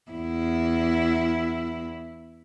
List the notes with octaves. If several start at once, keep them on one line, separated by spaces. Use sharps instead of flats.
E2 E4